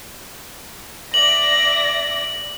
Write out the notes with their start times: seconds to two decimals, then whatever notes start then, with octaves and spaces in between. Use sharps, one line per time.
1.14 D5 E5 A#6 F#7